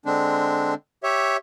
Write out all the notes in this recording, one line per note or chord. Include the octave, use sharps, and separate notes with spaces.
D3 G#3 C4 D4
G4 C#5 E5